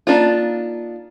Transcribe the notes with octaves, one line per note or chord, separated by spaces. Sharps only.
A#3 D4 D#4 F4